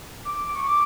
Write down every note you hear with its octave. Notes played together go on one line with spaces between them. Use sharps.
D6
D6
D6
C#6
D6